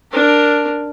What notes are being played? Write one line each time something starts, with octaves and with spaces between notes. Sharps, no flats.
D4 A#4